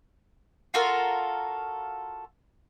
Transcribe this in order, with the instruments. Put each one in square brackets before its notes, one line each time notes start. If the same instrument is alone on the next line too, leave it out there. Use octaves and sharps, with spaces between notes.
[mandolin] F4 F#4 A4 A#4